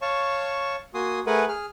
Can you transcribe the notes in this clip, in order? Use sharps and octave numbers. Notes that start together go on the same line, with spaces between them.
C#5 F5 A5 C#6
A#3 F#4 G#5 C6 D#6
A3 G#4 A#4 B4 F#5 G#5
G#4 F6